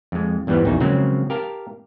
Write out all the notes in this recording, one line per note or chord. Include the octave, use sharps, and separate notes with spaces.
F2 G#3
E2 G2 E3 G3 B3 C4
A#1 E2 D#4 F#4
C#3 F3 F#3 G#3 A#3 C4
G4 A#4 F5 A5